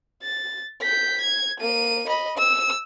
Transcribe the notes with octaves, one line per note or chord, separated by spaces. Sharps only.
A6
G6 B6
G#6
A#3 D#7
D#5 B5
E6